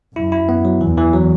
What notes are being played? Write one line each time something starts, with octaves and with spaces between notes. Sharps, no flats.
F#2 E4
E4
B3
F#3
E2 E3
E3
F#3